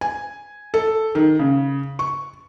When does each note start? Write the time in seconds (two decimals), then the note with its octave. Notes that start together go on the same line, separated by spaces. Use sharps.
0.01 G#5
0.74 A4
1.15 D#3
1.39 C#3
1.99 C#6